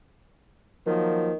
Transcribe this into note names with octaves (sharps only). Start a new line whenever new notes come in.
D#3 F3 F#3 A#3